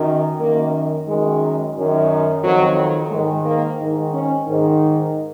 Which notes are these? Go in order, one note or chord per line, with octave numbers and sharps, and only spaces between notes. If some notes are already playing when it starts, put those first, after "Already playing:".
Already playing: F#2 D#3
F#2 D#3 A#3
F#2 D#3 G#3
F#2 D#3
F2 D#3 F#3
G#2 D#3 G#3
A#3
G#2 D#3
C#4
G#2 D#3